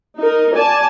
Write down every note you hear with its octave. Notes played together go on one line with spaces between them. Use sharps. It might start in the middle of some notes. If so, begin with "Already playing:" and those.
D#4 A#4
D5 G#5 A5